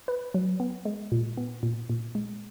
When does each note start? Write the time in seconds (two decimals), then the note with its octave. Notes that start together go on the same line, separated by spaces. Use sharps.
0.08 B4
0.34 F#3
0.60 B3
0.85 G#3
1.12 A#2
1.37 B3
1.63 A#2
1.89 A#2
2.15 G#3